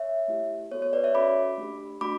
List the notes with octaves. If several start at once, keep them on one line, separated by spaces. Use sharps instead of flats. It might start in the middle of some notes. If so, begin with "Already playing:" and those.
Already playing: C#5 E5
A3 E4 G4
B3 F#4 A4 C#5
C#5
B4 D5
C#5 E5
C#4 F#4 A4 B5 D6
A3 D4 G4
A3 D4 F#4 B5 D6